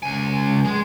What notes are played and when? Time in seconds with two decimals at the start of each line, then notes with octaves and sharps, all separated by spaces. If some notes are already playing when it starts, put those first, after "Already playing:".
0.03 C#2 G#5
0.65 G#3 G#4